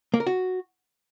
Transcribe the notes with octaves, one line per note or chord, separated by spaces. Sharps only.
A#3
A#4
F#4